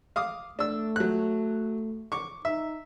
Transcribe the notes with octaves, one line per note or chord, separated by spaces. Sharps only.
F5 D6 D#6
A3 D4 E6
F#3 F#6
C#6 D6
D#4 E5